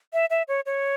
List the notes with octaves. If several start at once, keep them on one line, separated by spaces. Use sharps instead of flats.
E5
E5
C#5
C#5